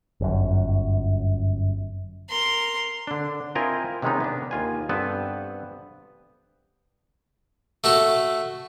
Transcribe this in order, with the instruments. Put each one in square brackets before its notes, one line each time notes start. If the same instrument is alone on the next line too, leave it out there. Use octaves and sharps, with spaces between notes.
[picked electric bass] G1 F#2
[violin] A#4 C6
[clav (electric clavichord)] D3 D4
C4 E4 F4 A#4 D#5 G#5
C3 D#3 G#3 B3 C#4 D#4
B3 D4
D#2 F4 G#5
G2 B3 C4 A4 B4
[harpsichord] A3 F#4 A4